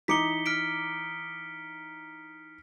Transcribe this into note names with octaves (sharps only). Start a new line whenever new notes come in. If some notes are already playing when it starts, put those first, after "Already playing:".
E3 D#4 D6 B6 C#7 G7
F6 B6 D7